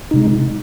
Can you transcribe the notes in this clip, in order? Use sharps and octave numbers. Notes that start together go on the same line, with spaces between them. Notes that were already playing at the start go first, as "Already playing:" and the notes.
C3 G#3 D#4